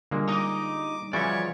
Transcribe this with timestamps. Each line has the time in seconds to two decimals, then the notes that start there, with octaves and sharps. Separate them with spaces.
0.11 A#2 D3 G3 G#3 A#3
0.29 D#4 D#5 D6
1.13 C#3 E3 F3 F#4 C#5 D5